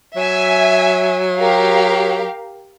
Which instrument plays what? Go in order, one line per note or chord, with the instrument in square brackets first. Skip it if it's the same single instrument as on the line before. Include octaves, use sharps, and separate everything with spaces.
[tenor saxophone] F#3 [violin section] E5 G#5
[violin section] G4 A#4 F5